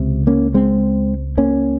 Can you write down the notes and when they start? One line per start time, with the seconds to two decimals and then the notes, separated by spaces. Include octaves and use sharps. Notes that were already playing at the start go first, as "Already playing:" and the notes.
Already playing: C#2 C3
0.27 A#3 C#4
0.54 G#3 C4
1.38 A#3 C#4